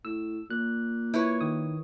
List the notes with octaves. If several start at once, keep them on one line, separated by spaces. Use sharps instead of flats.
A2 E6
A#2 F#6
E4 B4 C#5
D#3 D#6